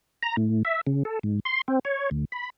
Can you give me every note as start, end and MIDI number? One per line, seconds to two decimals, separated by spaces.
0.23 0.36 82
0.37 0.63 45
0.65 0.81 76
0.87 1.03 49
1.05 1.19 69
1.23 1.39 44
1.45 1.61 84
1.68 1.79 60
1.85 2.10 73
2.11 2.25 38
2.32 2.50 83